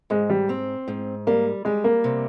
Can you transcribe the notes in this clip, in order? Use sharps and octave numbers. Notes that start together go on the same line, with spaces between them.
G#2 G#3
G3
C4
G#2
G3 A#3
G3 G#3
A#3
C3